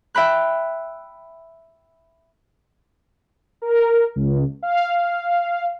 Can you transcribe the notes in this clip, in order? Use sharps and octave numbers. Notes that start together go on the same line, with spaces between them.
E5 G5 B5 F#6
A#4
C#2
F5